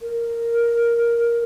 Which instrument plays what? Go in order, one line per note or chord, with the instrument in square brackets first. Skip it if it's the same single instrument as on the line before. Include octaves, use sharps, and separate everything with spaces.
[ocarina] A#4